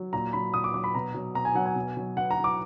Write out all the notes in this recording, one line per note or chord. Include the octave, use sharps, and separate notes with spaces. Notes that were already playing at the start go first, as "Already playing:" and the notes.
Already playing: F#3
A#2 A#5
F#3 B5
A#2 D#6
D6
F#3 D6
B5
B2 A#5
F#3
B2 A#5
G#5
F#3 F#5
G#5
B2
F#3
B2 F#5
A#5
F#3
D6